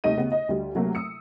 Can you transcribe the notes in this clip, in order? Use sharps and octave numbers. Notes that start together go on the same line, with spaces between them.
D#2 C3 G3 A3 D#5 D#7
C#3 B3
D#5
D2 G3
C3 F#3 A3 A#3
D#6 E6 C#7